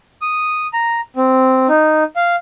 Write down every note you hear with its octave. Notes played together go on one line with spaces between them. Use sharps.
D#6
A#5
C4
D#4
F5